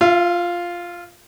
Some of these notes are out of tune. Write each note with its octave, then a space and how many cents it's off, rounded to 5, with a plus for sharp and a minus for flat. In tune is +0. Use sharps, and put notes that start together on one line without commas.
F4 +0 E5 +45